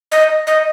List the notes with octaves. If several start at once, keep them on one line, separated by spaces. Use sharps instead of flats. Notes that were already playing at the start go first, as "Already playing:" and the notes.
D#5
D#5